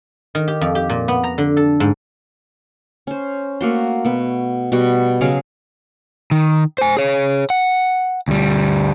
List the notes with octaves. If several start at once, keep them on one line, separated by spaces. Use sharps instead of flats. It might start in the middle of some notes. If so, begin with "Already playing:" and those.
D#3
G4
F2
G4
A#2
B3
A#5
D3
A4
G#2
C#4 C5
A3 A#3 F#4 C6
B2 B3
B2 G3 F#4
C#3 F#3 G#4 F5
D#3
C5 G#5
G#4 C#5
F#5
D2 G3